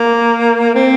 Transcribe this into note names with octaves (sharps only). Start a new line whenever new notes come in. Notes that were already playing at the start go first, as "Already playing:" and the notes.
Already playing: A#3
C4